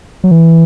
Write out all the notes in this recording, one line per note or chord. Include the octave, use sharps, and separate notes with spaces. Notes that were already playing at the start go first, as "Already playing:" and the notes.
F#3
E3